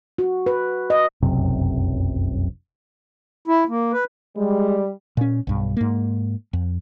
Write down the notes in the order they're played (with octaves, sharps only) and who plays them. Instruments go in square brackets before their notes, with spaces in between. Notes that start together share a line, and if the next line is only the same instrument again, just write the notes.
[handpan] F#4
B4
D#5
[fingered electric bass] F1 B1 F#2 C3
[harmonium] E4
A#3
B4
[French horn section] G3 [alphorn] G#3
[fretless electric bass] A#2 C#4
B1 G2
G#2 A#3
F2